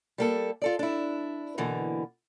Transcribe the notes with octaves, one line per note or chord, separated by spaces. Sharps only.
G3 A#3 A4
F4 A4 D5
D4 E4
B2 D3 E3 A#3